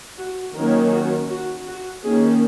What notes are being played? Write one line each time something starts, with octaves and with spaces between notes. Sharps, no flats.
F#4
D#3 F#3 A#3 C#4 A#4
F#4
F#4
F#4
D#3 A#3 C#4 G#4